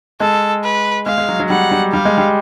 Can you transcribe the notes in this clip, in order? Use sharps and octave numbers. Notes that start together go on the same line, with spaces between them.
G#3 A4
B4
G#3 F5
G#3
F#3
F#3
G3 F#5
G3
G3 F5
G#3
G3